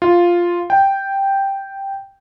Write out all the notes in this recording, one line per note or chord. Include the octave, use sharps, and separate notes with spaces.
F4
G5